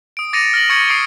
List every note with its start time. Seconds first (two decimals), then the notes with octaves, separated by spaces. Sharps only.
0.17 D#6 D7
0.33 D6 A6 A#6 C#7 D#7 F7
0.54 F6 A#6 F#7
0.70 C#6 F6 G#6 A6 C#7 F#7
0.88 D#6 C7 D7 G7